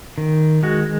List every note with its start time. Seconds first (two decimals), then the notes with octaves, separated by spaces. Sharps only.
0.18 D#3
0.63 G#3 F#4